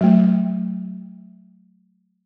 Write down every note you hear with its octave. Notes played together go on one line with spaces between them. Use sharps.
F#3 A3